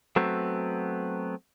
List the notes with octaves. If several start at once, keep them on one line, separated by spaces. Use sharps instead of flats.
F#3 A3 B3 C4